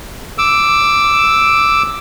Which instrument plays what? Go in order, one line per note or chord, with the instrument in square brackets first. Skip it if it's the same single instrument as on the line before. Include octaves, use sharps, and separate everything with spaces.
[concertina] D6 E6